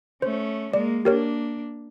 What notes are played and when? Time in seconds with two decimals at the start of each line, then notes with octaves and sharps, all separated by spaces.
0.22 A3 C#4 C5
0.74 G#3 A#3 D5
1.05 A#3 D4 G4 A#4 C#5